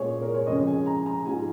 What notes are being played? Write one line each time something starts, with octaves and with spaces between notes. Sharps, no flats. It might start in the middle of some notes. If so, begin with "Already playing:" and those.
Already playing: A#2 G#3 G#4 C#5
A#4
C#5
F2 C#3 G#3 D#5
G#5
A#5
A#5
G#2 F3 G#3 G#5